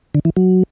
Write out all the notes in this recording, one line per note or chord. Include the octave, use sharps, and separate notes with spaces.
D3
E3
F#3